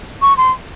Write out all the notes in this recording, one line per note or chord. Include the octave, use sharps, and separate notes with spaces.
C#6
C6